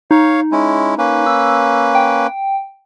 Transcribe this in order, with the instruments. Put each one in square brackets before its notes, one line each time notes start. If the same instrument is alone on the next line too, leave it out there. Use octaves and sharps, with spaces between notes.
[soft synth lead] D#4 [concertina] C#5 F5
[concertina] G#3 C#4 E4
A#3 C#4 B4
[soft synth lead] E6
G5